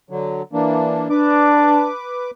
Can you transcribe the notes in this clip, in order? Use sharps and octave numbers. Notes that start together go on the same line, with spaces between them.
D3 F#3
E3 A#3 D4
D4 B4 D6